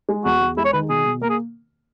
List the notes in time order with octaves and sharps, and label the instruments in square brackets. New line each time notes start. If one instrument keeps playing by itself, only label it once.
[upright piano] G#3
[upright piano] E2 [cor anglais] F#4
[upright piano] E2
[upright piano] G#3 [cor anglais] E4
[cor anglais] C#5
[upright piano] D#3 [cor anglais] B4
[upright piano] B2 [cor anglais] G#4
[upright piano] B2
[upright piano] A#3 [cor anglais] A#4
[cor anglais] G#4